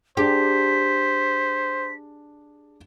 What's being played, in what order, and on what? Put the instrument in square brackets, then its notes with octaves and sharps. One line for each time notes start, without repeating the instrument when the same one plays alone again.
[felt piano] D4 G#4 [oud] G4 [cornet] C5 [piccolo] B6